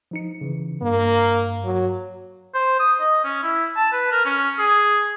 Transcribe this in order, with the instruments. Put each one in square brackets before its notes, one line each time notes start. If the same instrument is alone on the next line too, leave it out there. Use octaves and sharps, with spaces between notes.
[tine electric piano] F3 D#4 C#7
C#3 E3
[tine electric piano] G2 [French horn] A#3
[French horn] F#3
[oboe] C5
D#6
D#5
C#4
E4
A5
B4
A#4
C#4
G#4